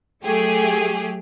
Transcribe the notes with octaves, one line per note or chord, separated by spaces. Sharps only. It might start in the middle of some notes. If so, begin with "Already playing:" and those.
F#3 A3 G4 G#4